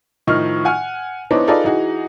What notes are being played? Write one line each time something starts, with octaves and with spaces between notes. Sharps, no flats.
A2 D#3 F3 D#5 F6
F#5 G#5 F6
E3 B3 D4 D#4 C5 C#5
D#4 F4 G#4 A4 B4 D5
E3 D#4 F#4 G#4